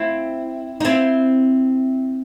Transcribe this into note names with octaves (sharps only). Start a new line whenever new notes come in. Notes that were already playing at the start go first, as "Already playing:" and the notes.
Already playing: C4 E4
D#4
C4 E4